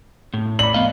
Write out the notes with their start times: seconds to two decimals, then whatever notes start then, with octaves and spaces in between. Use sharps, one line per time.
0.34 A2
0.59 D5 B5 F#7
0.74 F2 B3 D#5 F5